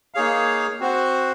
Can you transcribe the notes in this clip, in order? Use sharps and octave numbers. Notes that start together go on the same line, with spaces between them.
A#3 D#4 G#4 C#5 F5
C4 F#4 C5 F#5